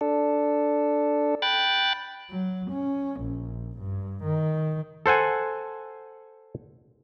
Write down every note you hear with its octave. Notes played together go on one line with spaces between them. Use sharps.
D4 A4
G5 B5 F#6 A6
F#3
C#4
A#1
G2
D#3
A4 C5 F#5 G#5